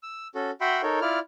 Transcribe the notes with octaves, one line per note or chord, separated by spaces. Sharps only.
E6
C#4 F#4 A4
F#4 E5 F#5 G5 B5 C6
D#4 A4 A#4 C#5
E4 F4 D5 F6